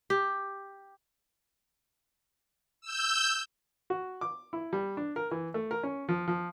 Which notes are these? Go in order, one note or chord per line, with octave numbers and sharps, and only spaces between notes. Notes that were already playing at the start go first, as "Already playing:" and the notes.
G4
E6 G6
F#4
D6
E4
G3
D4
A#4
E3
A3
A#4
C#4
F3
F3